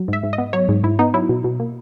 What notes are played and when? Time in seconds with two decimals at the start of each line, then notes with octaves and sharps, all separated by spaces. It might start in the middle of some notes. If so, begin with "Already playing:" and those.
Already playing: F#3
0.08 G#2 E5
0.23 G#2
0.33 D#5
0.38 B3
0.53 F#3 C#5
0.69 G#2
0.84 G#2 E4
0.99 B3 D#4
1.14 F#3 E4
1.29 B2
1.44 B2
1.60 A#3